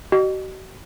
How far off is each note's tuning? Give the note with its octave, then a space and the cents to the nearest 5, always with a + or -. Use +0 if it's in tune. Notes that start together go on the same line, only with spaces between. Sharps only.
F#4 +45 D#5 -30